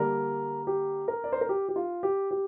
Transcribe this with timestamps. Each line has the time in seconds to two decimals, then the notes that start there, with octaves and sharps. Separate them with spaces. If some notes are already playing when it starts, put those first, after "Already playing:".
Already playing: D3 G3 A#3 D4 A#4
0.67 G4
1.08 A#4
1.24 D5
1.32 C5
1.41 A#4
1.49 G4
1.69 G4
1.76 F4
2.03 G4
2.31 G4